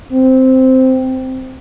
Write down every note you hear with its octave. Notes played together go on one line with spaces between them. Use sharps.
C4